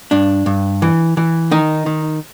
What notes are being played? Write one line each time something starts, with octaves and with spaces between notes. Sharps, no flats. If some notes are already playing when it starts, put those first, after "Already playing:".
G2 D4
G2
E3
E3
D#3 D#4
D#3